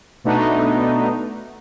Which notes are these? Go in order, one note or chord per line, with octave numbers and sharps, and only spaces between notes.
B2 A3 B3 D4 D#4